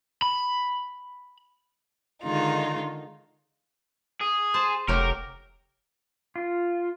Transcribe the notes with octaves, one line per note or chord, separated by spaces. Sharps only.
B5
D3 D#3 G#3 D#4 F4
G#4
C5 A5
F1 F#3 A3 G4 A#4
F4